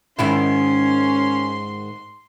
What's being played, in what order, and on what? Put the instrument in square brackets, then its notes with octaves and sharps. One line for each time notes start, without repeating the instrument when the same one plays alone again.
[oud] G#2 D#3 E4 [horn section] C#4 [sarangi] C6